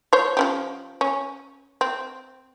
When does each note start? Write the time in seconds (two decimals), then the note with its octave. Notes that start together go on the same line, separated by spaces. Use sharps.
0.13 C5 C#5
0.37 F3 C#4 G4
1.01 C#4
1.81 C4